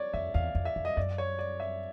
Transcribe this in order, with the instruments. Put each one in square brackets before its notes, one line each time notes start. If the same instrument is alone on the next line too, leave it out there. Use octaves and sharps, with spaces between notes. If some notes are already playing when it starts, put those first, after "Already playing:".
Already playing: [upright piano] C#5 D5
[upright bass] F2 [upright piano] E5
[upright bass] E2 [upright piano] F5
[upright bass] F2
[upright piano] E5
[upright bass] F2
[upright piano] D#5
[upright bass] F#2 [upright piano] D5
[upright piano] C#5
D5
E5